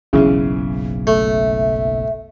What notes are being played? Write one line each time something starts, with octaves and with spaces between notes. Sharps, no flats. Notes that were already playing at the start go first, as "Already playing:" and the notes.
F#1 B1 G#2 C#3 E3
A3 E5